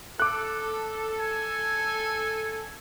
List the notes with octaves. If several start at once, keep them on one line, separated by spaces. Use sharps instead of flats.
A4 D6 F#6
G#5